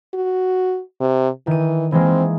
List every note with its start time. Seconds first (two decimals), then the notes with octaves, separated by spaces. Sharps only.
0.14 F#4
1.01 C3
1.47 D#3 E3 D#7
1.92 E3 G#3 A#3 C4